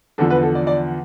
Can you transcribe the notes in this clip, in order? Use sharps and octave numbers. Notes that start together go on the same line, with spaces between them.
E2 D3 F3 A4
B4
A4
D5
D5